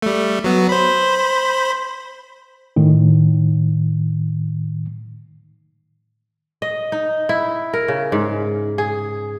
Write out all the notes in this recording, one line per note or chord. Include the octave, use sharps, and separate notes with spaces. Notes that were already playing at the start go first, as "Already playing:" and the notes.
G3 A3
F#3 B3
C5 B5
A2 D#3
D#5
D#4
E4
A#4
C#3
G#2
G#4